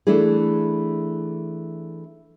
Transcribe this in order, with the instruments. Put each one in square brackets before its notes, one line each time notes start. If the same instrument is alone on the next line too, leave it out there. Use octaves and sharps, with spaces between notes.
[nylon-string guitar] E3 A3 D4 E4 G#4